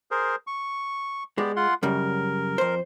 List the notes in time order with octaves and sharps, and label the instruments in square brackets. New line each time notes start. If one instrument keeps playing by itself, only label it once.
[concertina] G#4 A#4 C5
C#6
[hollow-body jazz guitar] G#3 [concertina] B3 G4 D5
[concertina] F4 F#5 C6
[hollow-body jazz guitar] F#2 C#3 G3 [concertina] A#4
[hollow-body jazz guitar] F2 C5